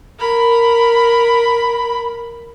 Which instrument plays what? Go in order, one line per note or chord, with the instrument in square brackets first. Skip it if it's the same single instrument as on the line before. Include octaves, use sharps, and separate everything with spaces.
[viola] A#4 B5